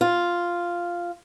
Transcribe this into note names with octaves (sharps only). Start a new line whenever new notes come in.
F4